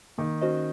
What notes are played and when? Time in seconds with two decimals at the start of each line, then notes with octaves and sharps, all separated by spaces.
0.18 D#3 A#3
0.41 C#4 F#4 C5 D#5